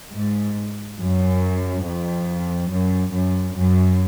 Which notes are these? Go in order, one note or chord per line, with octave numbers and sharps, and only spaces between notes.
G#2
F#2
F2
F#2
F#2
F#2